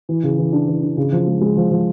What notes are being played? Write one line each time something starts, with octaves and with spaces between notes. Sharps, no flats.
E3
C#3
E3
D4
E3
D4
C#3
F3
G#3
G#3
F3
F3